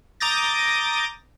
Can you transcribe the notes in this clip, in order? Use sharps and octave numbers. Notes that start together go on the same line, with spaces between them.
A#5 D6 D#6 G6 A6 A#6